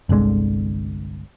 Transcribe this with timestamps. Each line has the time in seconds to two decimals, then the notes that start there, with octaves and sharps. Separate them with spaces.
0.09 G1 C2 D3 G#3